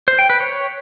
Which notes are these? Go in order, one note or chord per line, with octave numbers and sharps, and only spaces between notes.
C5
G5
B4
C#5